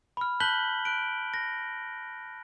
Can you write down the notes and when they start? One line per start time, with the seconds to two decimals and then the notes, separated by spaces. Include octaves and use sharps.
0.17 B5 F6
0.40 A5 F#6 G6 B6 F#7 G7
0.85 F#6 D7
1.34 A#6